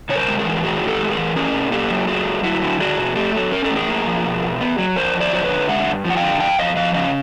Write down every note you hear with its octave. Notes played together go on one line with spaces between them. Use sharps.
C3 C#5
A#4 C5
G#3
G#4 A#4
E3
A2 F#4 G#4
A2
G4 A4
G#3
G#4 A#4
E3
C#4 G#4 A#4
B2
A#3 G4 A4
F#3
A3 F#4 G#4
G2
F#3 E4 F#4
D3
D4 F#4 G#4
B2
A3 G4 A4
F#3
C#4 A#4
A4
A2
G#4 A#4
A#3
F3
B2
B2
B3
F#3
F2 A#4 C5
F2
C5 D5
F#3 C5
B4 C#5
D3
G#3 E5 F#5
G2
F3
F#5
F5 G5
D3
F2 F5 G5
F2 D#5 F5
F3 D#5 F5
C#3 D#5 F5